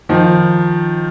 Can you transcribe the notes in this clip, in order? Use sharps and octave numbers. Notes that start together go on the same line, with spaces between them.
D#3 F3